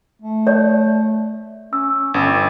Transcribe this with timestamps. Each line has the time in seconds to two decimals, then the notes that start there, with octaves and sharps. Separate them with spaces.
0.22 A3
0.47 C#5 D5
1.73 C#4 E6
2.14 G1 C#4